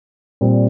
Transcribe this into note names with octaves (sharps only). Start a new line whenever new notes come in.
A#2 G3 C4